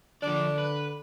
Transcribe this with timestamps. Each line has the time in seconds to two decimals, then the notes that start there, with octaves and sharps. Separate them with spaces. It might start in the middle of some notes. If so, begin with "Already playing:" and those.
0.23 D3 F3 D4 D5
0.59 B4